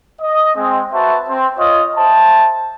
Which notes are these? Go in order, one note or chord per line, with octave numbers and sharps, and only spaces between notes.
D#5
G#3 C4
F#4 B4 C5 E5 A5
C4 C5
F4 C#5 D#5
C5 E5 A5